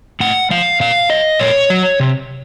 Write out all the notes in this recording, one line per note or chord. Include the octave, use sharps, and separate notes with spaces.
A2 F#5
F3 F5
A#2 F5
F#3 D#5
A#2 C#5
F#3
C3